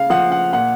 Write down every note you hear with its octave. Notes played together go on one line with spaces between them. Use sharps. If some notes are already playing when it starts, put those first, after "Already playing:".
Already playing: C#3 F5
F3 F#5
F#5
A#2 F#5